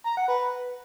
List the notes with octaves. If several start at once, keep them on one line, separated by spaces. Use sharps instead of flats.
A#5
F#5
B4